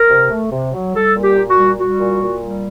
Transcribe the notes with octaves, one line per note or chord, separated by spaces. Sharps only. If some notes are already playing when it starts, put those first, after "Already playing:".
Already playing: A#4
C3
A3
C3
F#3
G3 A4
A#2
G4
A#2
F#4
G3
G3 F#4
A#2
A#2
G3